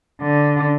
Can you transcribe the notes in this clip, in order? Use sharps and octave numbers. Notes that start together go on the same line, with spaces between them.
D3